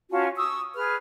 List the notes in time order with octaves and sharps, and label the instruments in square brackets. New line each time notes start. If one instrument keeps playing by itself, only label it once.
[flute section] C#4 F4 F#4 A5
C#6 D#6 E6
G#4 B4 F6